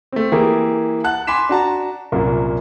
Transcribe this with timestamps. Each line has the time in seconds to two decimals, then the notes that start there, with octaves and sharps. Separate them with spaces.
0.13 A3 C4
0.32 E3 A#3 E4 G4 G#4
1.04 F#5 A5 F#6
1.27 G#5 B5 C6 D6 B6 E7
1.49 D4 F#4 A5 A#5
2.12 C2 F#2 A#2 A#3